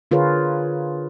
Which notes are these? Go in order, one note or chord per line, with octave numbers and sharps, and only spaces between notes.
D3 F4 G#4 A#4 B4 C#5